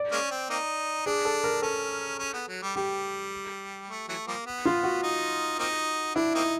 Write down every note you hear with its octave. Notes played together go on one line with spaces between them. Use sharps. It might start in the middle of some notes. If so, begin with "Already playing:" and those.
Already playing: D5
G#3 A#3 C#4
C4
A#3 C4 D#4
D4 G#4
A4
A#4
C#4 A4
C#4
B3
F#3
G3
G3 G4
A3
E3 F#3 A3
F3 G3 A#3
B3
F4
F#4
D#4
A#3 C4 D#4
D4 E4
A#3 C4 D#4